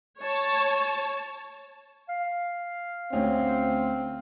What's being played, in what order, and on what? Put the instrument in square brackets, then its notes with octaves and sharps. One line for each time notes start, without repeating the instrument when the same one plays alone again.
[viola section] C#5 A5
[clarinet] F5
[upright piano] D2 C#4 [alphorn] C4